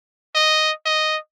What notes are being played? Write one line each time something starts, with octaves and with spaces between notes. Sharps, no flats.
D#5
D#5